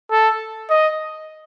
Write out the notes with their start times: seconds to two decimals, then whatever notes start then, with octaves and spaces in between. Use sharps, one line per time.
0.11 A4
0.70 D#5